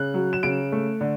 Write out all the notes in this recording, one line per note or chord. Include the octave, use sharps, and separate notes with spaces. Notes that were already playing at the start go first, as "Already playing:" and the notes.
Already playing: C#3 F#6
F#3
E7
C#3 D7
A3
D3